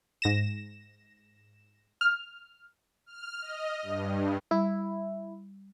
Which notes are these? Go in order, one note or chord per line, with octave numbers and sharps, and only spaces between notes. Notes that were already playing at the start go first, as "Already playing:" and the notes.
G#2 A#6 E7
F6
F6
D#5
G2
G3 E4